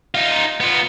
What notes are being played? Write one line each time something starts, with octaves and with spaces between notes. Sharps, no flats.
D#4 F4
B3 F4